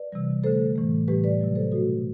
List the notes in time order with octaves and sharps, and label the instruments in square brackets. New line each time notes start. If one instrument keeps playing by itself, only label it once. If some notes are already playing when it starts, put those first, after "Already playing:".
Already playing: [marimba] B4 D5
C3 E3 G3
D3 A3 A4 C5
A2 E3 A3
A2 E3 G3 G4 B4
B4 D5
C3 F#3 A3
A4 C5
B2 A3 F#4 A4